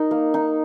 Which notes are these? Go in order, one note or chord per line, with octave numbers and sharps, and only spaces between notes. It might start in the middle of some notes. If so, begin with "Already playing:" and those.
Already playing: D#4 A#4
A#3
D#4